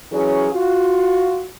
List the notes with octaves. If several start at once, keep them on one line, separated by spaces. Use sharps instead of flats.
E3 F#3 C#4 G#4
F4 F#4